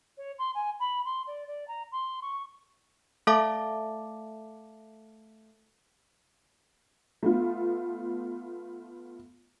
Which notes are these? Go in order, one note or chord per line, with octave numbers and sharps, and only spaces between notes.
C#5
C6
G#5
B5
C6
D5
D5
A#5
C6
C#6
A3 A4 E5 F5 A5 D6
A3 B3 F4